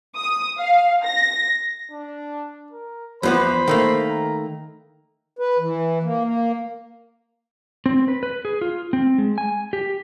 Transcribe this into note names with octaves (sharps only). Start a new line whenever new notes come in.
D#6
F5
A#6
D4
A#4
E2 F3 B3 C5 B5
D#3 A3 A#3
A#5
B4
E3
A#3
A#3
C4
B4
B4
G#4
F4
C4
G#3
G#5
G4